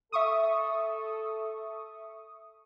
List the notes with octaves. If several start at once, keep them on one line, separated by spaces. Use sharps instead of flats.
A4 E5 C#6 D#6